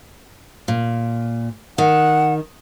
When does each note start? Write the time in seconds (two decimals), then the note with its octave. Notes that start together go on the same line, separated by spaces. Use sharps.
0.68 A#2
1.78 D#3 F#5